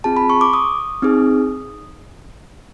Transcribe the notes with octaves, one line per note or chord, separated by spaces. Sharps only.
C4 F4 G#4 A5
B5
C#6
D6
D#6
C4 D#4 G#4